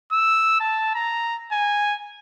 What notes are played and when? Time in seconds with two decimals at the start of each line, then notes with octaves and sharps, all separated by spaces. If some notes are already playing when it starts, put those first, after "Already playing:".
0.12 E6
0.60 A5
0.95 A#5
1.52 G#5